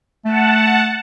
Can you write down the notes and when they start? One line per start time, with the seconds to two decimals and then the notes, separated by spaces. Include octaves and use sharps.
0.25 A3 F#5 A5